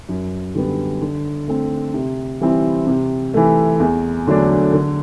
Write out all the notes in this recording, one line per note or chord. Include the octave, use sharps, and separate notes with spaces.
F#2
D3 G3 B3
D3
A3 C4
C3
E3 G3 C4 E4
C3
E3 A3
E2
D3 F#3 A3 D4
D3